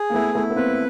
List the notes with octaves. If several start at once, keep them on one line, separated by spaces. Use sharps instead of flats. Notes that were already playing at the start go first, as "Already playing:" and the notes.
Already playing: G#4
A#3
A3 B3 E4
A3 B3 E4
B3
A#3 C4 B4